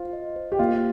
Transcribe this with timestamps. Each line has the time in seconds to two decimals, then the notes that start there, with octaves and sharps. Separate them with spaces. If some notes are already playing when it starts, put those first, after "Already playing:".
Already playing: F4 C5
0.13 D#5
0.36 C5
0.52 G4
0.59 A#3 F4